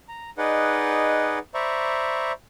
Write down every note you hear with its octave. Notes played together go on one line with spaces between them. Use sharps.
A#5
D#4 G#4 B4 D5 D#5 F#5
C5 D5 E5 A#5 B5 C#6